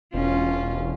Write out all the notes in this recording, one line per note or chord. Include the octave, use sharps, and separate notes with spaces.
E1 C#4 F4